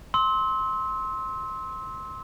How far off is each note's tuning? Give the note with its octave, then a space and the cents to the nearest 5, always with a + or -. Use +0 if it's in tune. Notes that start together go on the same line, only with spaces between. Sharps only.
C6 +10 E6 -35